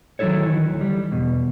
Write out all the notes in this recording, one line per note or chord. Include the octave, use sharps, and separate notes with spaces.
D#3 F#3 A#3 E4 A4 C#5
D#3 E3
D2
G3
E2 B2